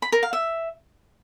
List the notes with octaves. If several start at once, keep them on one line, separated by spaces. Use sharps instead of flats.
B5
A#4
F5
E5